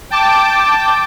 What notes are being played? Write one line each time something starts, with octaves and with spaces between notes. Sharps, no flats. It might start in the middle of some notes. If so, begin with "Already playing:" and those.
G5 A5 D6